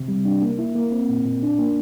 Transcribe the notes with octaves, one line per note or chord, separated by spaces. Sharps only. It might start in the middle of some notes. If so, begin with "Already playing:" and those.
Already playing: C3
G3
D4
A#3
E4
A#3
C4
A#2
A#2
D4
A#3